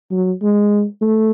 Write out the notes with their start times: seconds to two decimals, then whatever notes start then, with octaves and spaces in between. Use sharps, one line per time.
0.11 F#3
0.42 G#3
1.01 A3